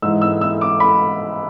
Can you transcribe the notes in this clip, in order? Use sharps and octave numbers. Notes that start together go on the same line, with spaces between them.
G#2 E3 E6
E6
E6
D6
B5